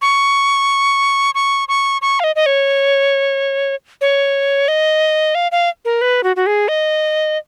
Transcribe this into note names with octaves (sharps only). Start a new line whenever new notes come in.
C#6
C#6
C#6
C#6
F5
D#5
D#5
C#5
C#5
D#5
F5
F5
A#4
B4
F#4
F#4
G#4
D#5